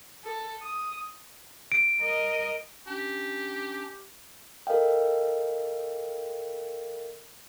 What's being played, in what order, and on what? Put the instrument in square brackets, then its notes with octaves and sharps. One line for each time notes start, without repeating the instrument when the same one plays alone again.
[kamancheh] A4
D#6
[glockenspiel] D7
[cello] A#4 D#5
[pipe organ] C#4 D4 [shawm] G4
[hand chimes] A4 A#4 D#5 F5 G5